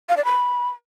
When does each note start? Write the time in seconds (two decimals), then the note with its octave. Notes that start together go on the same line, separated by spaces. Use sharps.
0.09 F5
0.17 D5
0.25 B5